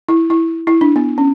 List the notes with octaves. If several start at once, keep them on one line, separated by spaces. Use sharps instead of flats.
E4
E4
E4
D4
B3
C#4